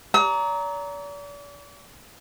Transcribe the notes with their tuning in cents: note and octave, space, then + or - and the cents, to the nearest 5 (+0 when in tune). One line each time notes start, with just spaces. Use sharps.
D5 -40 A#5 +0 D#6 +45